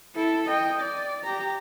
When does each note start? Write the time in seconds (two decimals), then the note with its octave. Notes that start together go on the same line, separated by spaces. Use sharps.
0.15 E4 A4
0.49 D#5 G5
0.81 D5
1.24 G4 A#5